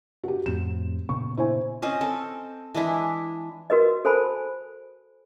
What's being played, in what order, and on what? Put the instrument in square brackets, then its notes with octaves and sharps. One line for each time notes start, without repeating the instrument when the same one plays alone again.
[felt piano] F#4 G4
[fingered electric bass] F2 A2 C4 [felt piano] E7
[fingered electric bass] A#2 C#3 B3 [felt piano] C#6
[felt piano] E4 C5 G#5
[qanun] C4 C#4 C5 D#5
C4 A4
E3 G#3 D4 E4
[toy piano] F#4 A#4 B4 D#5
A4 A#4 C5 G#5 A5 B5